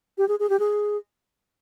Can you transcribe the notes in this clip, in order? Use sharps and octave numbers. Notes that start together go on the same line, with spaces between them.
G4
G#4
G#4
G4
G#4